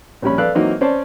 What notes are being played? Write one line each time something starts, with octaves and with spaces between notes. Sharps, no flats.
A#1 G3 C#4 B5
A4 B4 D5 F5 F#6
E3 F#3 A#3 C4 D#4 A#4
C#4 C5 D5 A5